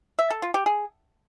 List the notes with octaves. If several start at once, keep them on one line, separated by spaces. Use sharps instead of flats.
E5
A4
F4
G4
G#4